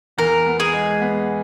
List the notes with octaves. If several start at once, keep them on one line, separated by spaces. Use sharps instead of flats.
E2 A#4
B3
G#4
G#3
B3